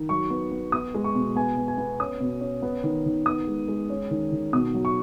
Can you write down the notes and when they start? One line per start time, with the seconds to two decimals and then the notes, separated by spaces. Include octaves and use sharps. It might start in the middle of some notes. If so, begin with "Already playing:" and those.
Already playing: D#3
0.09 F#3 C#6
0.30 B3
0.52 B3
0.72 B3 D#6
0.95 G#3
1.04 C#6
1.15 B2
1.36 B3 G#5
1.57 B3
1.68 G#5
1.78 B3
2.00 C#4 D#6
2.20 B2
2.41 C#4
2.62 B3
2.84 D#3
3.06 D#3
3.26 B3 D#6
3.47 G#3
3.68 G#3
3.90 C#4
4.11 D#3
4.32 D#3
4.53 B2 D#6
4.74 F#3
4.85 C#6